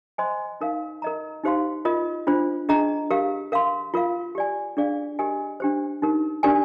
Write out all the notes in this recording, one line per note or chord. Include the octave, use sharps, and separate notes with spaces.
C5 D#5 G#5 C6
D#4 A#4 F5
A#4 D#5 A#5
D#4 G4 C5 F5 C6
F4 A#4 D#5
D4 F4 C5
D4 G#4 D#5 A#5
G4 A#4 F5
A#4 F5 C6
F4 A#4 F5
G4 D5 G#5
D4 G#4 D5 F5
G4 A#4 D#5 G#5
D4 G4 C5
D#4 G4 A#4
D4 G4 A#4 D5 G#5